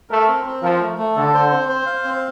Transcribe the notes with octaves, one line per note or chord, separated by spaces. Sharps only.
A3 A#4
C4
C4
F3 A#4
A3
A3
D3 A4
C5
C4
C5
F5
C4